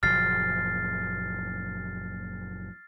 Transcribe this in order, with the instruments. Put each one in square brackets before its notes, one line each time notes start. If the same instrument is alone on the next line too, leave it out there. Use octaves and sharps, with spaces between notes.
[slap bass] F#1 A#2 F3 [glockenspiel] F6 A6 C7